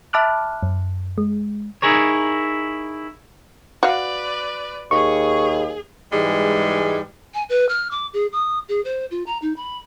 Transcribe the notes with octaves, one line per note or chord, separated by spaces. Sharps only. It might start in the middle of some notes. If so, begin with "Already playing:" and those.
E5 A5 B5 D6 F6 F#6
F#2
G#3
D#4 E4 G#4 A#4 C#5
F#4 B4 D5 F5
D#2 G#4 C#6
G#2 E3 G3 G#3
G#5
B4
F6
D6
G#4
D#6
G#4
C5
F4
A#5
D#4
B5